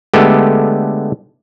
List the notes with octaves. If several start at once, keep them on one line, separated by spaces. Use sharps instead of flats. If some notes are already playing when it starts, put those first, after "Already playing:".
D3 G#3 A3 B3 G4 A4